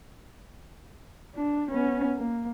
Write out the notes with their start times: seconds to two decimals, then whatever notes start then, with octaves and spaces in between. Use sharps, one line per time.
1.35 D4
1.71 B3 C#4
2.17 A#3